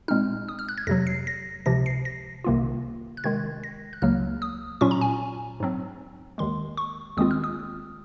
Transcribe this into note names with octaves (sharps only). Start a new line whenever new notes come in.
A#2 G#3 C4 D#4 F6
D#6
F6
F#6
G#6
F2 C3 F#3 A#6
C7
A#6
C#2 C3 F3 A#6
C7
A#6
C2 C3 D#3 A#3 F4
F#6
C3 D#3 G#3 G#6
A#6
F#6
C#2 C#3 F#3 A#3 F6
D#6
A#2 F#3 C#4 F4 C#6
A#5
G#5
G#2 F#3 C4
D#2 D#3 G#3 C6
C#6
D#2 D#3 G#3 C4 F4 D#6
F6
D#6